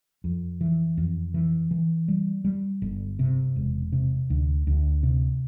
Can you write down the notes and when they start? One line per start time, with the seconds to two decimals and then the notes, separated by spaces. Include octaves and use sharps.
0.24 F2
0.61 E3
0.97 F2
1.34 E3
1.71 E3
2.08 G3
2.45 G3
2.82 G1
3.19 C3
3.56 E1
3.92 C3
4.30 D2
4.67 D2
5.03 C3